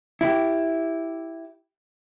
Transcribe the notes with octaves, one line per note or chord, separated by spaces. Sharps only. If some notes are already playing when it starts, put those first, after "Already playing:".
E4 G4